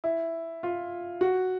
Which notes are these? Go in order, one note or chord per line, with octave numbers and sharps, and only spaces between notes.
E4
F4
F#4